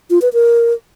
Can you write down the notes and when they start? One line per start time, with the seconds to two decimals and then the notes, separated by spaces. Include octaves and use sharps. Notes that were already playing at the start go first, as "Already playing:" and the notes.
0.10 F4
0.22 B4
0.33 A#4